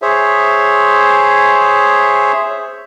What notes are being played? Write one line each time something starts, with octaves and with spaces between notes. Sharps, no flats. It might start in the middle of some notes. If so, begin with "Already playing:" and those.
G#4 C5 C#5 E5